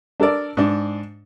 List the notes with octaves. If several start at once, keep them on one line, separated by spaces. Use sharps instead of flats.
D4 A4 A#4 D5
G#2 D4